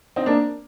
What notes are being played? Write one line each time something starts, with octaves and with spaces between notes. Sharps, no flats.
C4 D#4
A#3 D4